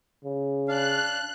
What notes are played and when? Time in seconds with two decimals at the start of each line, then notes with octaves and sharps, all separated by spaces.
0.24 C#3
0.68 D4 F5 F#6